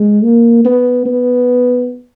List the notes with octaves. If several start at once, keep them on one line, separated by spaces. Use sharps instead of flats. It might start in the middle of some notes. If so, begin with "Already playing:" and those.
Already playing: G#3
A#3
B3
B3